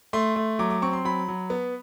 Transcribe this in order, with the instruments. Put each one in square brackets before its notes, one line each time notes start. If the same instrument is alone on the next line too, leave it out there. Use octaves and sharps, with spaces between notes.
[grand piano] A3 C6
A3
F#3 D6
D6
C4 C#6
C6
F#3 B5
F#3
B3